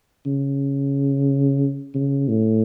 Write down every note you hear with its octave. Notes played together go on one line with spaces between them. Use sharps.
C#3
C#3
A2